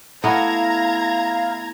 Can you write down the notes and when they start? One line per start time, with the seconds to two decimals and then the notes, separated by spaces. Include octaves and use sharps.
0.24 A3 B3 E4 F5 A#5 G#6